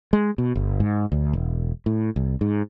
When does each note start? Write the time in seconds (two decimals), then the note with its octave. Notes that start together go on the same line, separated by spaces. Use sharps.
0.13 G#3
0.38 B2
0.55 G1
0.80 G#2
1.12 D2
1.33 E1
1.86 A2
2.16 C2
2.41 G#2